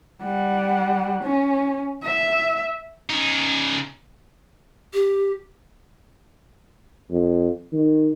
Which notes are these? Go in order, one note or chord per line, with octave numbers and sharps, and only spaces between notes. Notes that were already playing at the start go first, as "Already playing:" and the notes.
G3 F#5
C#4
E5
C#3 D#4
G4
F2
D#3